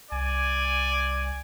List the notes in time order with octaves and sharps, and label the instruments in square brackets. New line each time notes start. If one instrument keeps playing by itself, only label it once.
[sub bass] C2 [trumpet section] D5 G#5